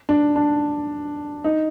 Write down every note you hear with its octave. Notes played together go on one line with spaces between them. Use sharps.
D4
D4
D#4